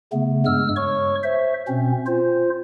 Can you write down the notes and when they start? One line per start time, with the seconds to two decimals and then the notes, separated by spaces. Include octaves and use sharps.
0.12 C#3 A3 B3
0.46 G2 G#3 E6 F6
0.76 C#5 C#6
1.23 C5 E5
1.68 B2 C4 C#4
2.06 F4 C5